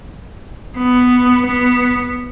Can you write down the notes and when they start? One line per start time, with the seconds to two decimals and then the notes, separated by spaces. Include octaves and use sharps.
0.77 B3
1.46 B3